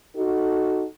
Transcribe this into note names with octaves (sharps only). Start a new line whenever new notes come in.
D#4 F#4 A4